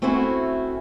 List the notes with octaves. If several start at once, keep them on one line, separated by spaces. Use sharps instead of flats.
A3 C4 C#4 E4 F#4